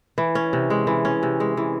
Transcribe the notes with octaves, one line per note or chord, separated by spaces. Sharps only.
E3
C#4
C3
G#3
E3
C#4
C3
G#3
E3